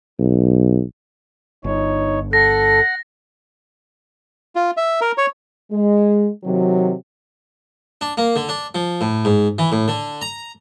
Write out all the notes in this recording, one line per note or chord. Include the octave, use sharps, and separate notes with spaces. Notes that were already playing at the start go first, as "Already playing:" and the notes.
B1
G1 D#4 C#5
A4 F#5 A#6
F4
E5
A#4
C#5
G#3
C3 D#3 F#3
D4
A#3
D3
D4
F3
A2
G#2
E3
A2
D3
A#5